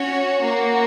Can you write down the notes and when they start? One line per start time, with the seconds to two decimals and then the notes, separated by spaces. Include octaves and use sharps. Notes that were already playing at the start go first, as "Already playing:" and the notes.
Already playing: C#4 F#4 C#5
0.44 A#3 F#4